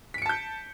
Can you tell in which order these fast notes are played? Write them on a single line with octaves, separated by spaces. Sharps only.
B6 D7 C#7 A5 G6